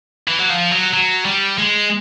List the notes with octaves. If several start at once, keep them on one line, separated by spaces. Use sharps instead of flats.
E3
F#3
F3
F#3
F#3
G3
G#3